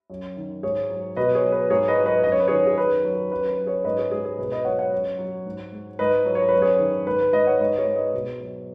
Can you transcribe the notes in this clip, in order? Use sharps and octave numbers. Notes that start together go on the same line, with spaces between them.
F#2
D#3
G#2 G#4 C#5
F#3
B2 B4 D#5
G#4 C#5
F#3
B4
G#2 G#4 C#5
B4 D#5
F#3
B4 D#5
F#2 D#5
C#5
B4
D#3 G#4 C#5
G#4
F#2 B4
F#3
F#2 B4
B4
F#3
G#4 C#5
G#2 B4 D#5
G#4 C#5
G#3 G#4
G#4
B2 B4
B4 D#5
F#3 C#5 F#5
C#5 F#5
F#2
F#3
G#2
G#3
G#2 B4 D#5
F#3
C#5
F#2 B4
G#4 C#5
D#3
G#2 B4
B4
G#3 B4 D#5
C#5 F#5
G#2 B4 D#5
G#4 C#5
G#3
B4 D#5
B2
F#3